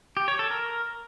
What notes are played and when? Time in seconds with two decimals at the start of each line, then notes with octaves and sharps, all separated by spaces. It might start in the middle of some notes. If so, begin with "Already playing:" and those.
0.17 G4
0.28 C#5
0.39 A4
0.50 A#4